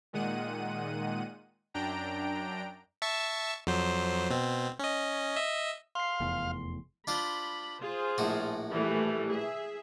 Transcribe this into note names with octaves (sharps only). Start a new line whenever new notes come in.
A#2 D#3 G#3 F#5 D#7
F#2 D4 G5 A#5 D7
E5 A5 C#6
F2 F#3 C5
B2 C4
C#4 D#5
D#5 E5
F5 C6 C7
F1 E2
D4 F4 C5 B5
F4 G#4 C5
A#1 A2 F#4
E3 G3 A3
G#4 E5